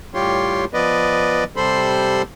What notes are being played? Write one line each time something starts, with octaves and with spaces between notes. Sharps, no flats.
A2 G3 F4 G4 C#5 C6
F3 B3 B4 D5 D#5
C3 G3 A4 C5 B5 C6